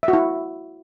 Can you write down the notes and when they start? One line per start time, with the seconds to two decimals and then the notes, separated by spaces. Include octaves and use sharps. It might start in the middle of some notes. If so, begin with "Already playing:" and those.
0.03 E5
0.08 F#4
0.13 E4